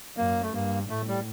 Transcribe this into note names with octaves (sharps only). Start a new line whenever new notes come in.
F#2 A#3
A3
G2 A#3
A2 A3
G3